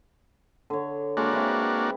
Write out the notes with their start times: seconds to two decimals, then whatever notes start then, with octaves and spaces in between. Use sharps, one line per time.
0.70 D3 C#5
1.17 G#3 A#3 D4 F#4
1.33 C4 E4 B4